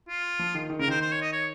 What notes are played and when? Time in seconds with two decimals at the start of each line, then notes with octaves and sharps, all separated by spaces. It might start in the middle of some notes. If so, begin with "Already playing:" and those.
0.09 F4
0.39 F3
0.55 D#3
0.70 D#3
0.79 C#3 A#4
0.88 D#3 C5
1.02 C5
1.12 C#5
1.22 D#5
1.32 C#5